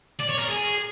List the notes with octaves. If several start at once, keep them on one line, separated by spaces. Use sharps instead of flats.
D5
C#5
A#4
G#4